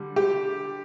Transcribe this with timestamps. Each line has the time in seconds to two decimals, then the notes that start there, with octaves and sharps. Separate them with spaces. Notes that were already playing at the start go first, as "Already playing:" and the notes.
Already playing: D3 G3
0.16 G4